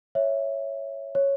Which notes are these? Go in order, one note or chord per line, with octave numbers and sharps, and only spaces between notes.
C#5 E5
C#5